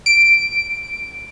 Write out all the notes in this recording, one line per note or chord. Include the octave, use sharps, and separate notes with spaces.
D7